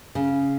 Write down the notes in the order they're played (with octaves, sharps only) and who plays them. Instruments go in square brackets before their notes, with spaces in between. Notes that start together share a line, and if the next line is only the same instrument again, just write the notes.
[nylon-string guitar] C#3